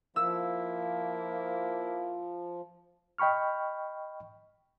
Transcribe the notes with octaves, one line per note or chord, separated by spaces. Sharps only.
F3 A#3 E4 E6
D#5 G5 B5 C#6 F6